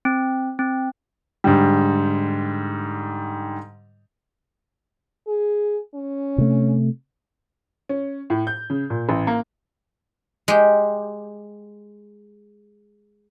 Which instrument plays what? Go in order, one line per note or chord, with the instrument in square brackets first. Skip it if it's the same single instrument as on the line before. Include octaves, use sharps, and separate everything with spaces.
[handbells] C4
C4
[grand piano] G#2 D3 G3
[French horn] G#4
C#4
[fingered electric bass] C3 A3
[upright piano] C#4
A2
G6
C#3
A#2
A1
A#3
[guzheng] G#3 G4